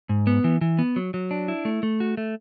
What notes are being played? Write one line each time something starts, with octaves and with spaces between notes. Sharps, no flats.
G#2
B3
E3
E3
B3
F#3
F#3
D4
E4
A3
A3
F#4
A3